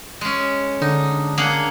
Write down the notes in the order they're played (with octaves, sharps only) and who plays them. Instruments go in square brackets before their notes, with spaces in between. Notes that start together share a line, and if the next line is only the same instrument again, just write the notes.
[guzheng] G#3 C#4
[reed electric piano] D3 [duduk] D4 [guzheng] D#4
[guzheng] A#3 G#4 F#5 [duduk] D4